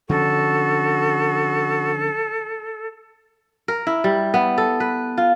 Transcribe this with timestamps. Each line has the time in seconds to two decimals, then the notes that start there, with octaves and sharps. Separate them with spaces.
0.09 D3 F3 C#4 F#4 A4
3.68 A#4
3.87 E4
4.04 G3
4.34 B3
4.58 A4
4.80 B4
5.18 F4